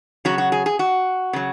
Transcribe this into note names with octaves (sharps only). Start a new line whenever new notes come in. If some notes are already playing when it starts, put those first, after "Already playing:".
C#3 F#3 F#4
F#4
G#4
G#4
F#4
C#3 F#3